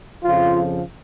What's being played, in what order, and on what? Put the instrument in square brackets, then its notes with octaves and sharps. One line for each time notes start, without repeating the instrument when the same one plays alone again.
[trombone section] F2 C#3 F3 F4